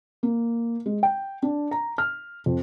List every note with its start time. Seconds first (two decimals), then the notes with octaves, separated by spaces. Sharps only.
0.23 A#3
0.86 G#3
1.03 G5
1.43 D4
1.71 A#5
1.98 F6
2.46 F2